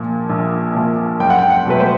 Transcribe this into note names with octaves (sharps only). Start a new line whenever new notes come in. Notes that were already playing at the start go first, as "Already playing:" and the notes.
Already playing: A#1 A#2 F3
A#1
A#2 F3
F#1 G5
F#5
G5
F#5
E2 B2 F#3 A3 B4
C5